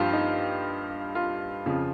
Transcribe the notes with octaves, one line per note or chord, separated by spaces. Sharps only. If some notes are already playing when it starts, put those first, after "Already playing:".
Already playing: G2 F3 F4 G4
D#4
F4
F2 C#3 F3